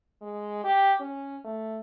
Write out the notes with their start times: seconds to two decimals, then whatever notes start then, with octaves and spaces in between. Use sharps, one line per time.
0.22 G#3
0.64 G4
1.00 C#4
1.44 A3